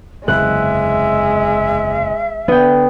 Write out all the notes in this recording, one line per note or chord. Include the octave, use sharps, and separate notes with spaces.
F#1 E2 C3 G#3 E5 F#6
D3 B3 G5